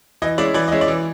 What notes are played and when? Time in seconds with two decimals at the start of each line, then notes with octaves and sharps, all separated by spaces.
0.22 E3 D#5
0.38 G#3 C#4 E4 D5
0.54 E3 D5
0.68 G#3 C#4 E4 D#5
0.81 D5
0.88 E3